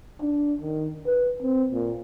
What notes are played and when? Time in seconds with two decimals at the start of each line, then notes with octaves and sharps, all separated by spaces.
0.21 D4
0.61 D#3
1.06 B4
1.42 C4
1.72 A#2